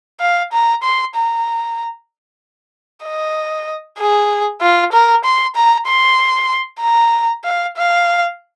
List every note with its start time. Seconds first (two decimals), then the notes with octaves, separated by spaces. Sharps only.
0.20 F5
0.52 A#5
0.83 C6
1.15 A#5
3.04 D#5
3.99 G#4
4.62 F4
4.93 A#4
5.25 C6
5.56 A#5
5.87 C6
6.81 A#5
7.44 F5
7.77 F5